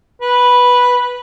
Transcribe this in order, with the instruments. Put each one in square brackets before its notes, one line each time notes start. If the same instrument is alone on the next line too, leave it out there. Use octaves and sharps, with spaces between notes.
[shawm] B4